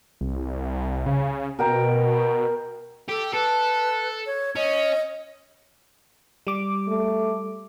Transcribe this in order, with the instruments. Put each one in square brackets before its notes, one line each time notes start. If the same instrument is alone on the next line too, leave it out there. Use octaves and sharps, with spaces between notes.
[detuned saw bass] C2
C#3
[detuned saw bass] B2 [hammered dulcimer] A#4 G5 A#5
[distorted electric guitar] G4 [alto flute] A4
[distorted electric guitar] A4 [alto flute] B4
[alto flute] C#5
[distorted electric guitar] C#4 [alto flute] D#5
[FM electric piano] G3 D6
[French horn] A3